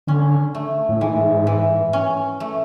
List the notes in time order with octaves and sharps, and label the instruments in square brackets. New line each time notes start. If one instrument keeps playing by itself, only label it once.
[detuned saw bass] D3 [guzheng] C#4
[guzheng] A3
[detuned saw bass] A2
[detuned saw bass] G#2 [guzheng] E3
[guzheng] E3
C#4
A3